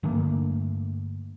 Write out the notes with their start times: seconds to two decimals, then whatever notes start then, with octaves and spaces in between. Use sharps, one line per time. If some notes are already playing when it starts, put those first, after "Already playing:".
0.03 G2 D3 A3 A#3